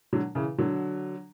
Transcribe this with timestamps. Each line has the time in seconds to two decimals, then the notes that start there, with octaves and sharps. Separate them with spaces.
0.13 D3 F#3
0.35 C#3 E3
0.58 D3 F#3